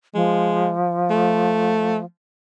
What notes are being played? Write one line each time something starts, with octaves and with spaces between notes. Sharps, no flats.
F3 G#3
A3